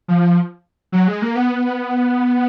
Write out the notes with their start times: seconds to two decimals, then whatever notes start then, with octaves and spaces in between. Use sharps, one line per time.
0.08 F3
0.92 F#3
1.08 G#3
1.22 A#3
1.36 B3